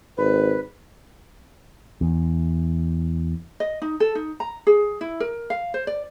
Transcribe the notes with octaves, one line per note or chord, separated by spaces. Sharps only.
G#1 B4
E2
D#5
D#4
A4
D#4
A#5
G#4
E4
A#4
F5
C5
D5